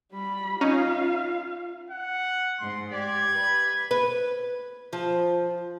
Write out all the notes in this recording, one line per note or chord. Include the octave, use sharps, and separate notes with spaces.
G3 B5
C#4 D#4 F4 F5
F#5
G#2 C6
G4 D5 G#6
B4
B4
F3